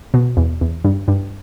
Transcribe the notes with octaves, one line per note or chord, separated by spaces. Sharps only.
B2
E2
E2
G2
G2